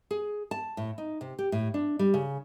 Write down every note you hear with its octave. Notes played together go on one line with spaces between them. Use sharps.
G#4
A5
A2
D#4
C3
G4
A2
D4
G3
C#3